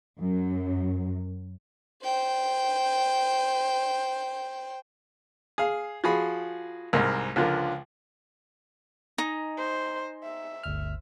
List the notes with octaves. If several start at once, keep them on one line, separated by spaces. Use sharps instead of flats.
F#2
C5 G5
G#4 F5
F3 F#4 G#4 B5
C2 G#2 A#4 F6
C#2 D3 F3 A#4
D#4 G#5 A#5
C5
E5
G1 D2 F6